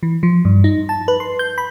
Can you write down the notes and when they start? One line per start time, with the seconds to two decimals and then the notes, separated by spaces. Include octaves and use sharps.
0.03 E3
0.23 F3
0.45 G2
0.64 D#4
0.89 A5
1.08 B4
1.20 C6
1.39 G6
1.58 B5